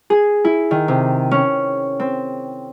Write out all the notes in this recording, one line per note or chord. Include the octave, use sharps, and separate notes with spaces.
G#4
E4
D#3
C3
C#4
C4